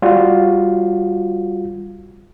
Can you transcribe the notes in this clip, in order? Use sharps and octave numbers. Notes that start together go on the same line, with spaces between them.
G3 F4 F#4